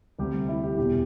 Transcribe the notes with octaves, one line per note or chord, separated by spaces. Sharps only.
D2 C3 G3 G4
E4
G4
E1 E2 E3 G4